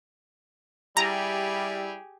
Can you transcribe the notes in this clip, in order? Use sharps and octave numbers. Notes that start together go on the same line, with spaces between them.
G3 E4 G4 G#4 A#5